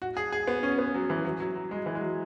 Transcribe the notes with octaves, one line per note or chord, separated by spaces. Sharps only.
F#4
G#4
G#4
B3
C#4
B3
F#3
E3
F#3
F#3
F#3
G#3
E3
G#3
F#3